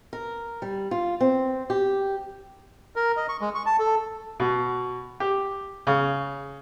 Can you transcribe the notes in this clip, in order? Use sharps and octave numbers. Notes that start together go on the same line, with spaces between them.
A#4
G3
F4
C4
G4
A#4
D#5
C#6
G#3
C#6
A5
A4
B2
G4
C#3